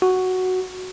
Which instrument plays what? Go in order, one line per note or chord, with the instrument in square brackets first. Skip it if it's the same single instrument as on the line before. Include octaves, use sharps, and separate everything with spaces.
[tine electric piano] F#4